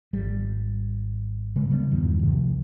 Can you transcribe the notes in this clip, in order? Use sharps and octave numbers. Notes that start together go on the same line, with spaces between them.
G#1 G3
C#3 G#3
C#3 G3 A3 B3
E2 G2 D#3
C2 C3 F3 A3